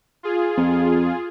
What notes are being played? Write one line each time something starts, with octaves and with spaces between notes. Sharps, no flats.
F4 G#4
F2